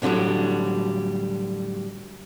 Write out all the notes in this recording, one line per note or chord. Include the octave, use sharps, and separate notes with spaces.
A2 D3 E3 F#3 G3